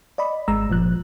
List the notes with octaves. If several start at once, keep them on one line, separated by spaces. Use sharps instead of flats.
D5 D#5 B5
G#1 G#3 A#5 E6
G1 A#2 F3 F#6